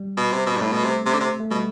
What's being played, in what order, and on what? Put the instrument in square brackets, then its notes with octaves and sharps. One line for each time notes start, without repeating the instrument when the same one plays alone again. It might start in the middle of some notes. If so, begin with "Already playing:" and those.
Already playing: [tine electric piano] G3
[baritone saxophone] B2
C3
B2
G2
[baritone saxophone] A2 [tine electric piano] A3
[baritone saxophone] B2
C3
C3
D3
C3
[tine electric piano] A3
[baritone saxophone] B2 [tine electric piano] G3